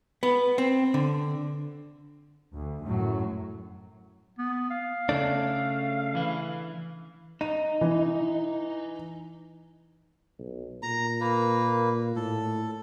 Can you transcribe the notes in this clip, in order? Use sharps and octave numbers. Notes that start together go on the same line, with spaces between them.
B3
C4
D3
D2
F#2 A2 F#3
B3
F5
C#3 A3 D4
E3 B4
D#4 D#7
E3
B1
A#2 A#5
A#3 B4
A2 A4